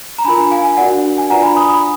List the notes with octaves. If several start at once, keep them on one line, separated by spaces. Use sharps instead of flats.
A#5
D4 F4 A#4 G#5 B5
F5 G#5
D4 F#4 A#4 D5 F#5
G#5
D4 F4 B4 D5 F#5 A#5
G#5 B5
B5 D#6
B5 D#6